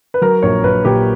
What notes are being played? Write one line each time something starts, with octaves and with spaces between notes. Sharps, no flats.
B4
F#3 A#4
A#1 C#5
A#1 B4
A#2 G4